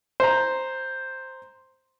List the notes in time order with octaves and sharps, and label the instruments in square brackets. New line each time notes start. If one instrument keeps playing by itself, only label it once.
[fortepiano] C5 A#5